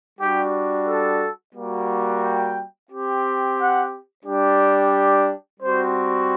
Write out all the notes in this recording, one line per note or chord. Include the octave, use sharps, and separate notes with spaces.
G3 D4 F#4 G4
A4
G3 A#3 F#4
G5
C4 G4
F#5
G3 D4 G4
G3 C4 F#4 C5